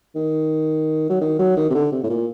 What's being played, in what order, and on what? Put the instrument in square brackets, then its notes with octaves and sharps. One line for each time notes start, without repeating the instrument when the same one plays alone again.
[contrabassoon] D#3
F#3
D#3
F#3
D#3
C3
D3
C3
A2
A#2